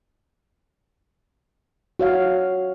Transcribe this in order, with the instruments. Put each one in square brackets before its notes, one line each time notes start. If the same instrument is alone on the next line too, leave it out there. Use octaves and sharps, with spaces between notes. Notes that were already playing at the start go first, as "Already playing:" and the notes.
[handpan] F#4 C#5 F5